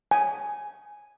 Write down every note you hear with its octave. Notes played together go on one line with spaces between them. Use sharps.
G#5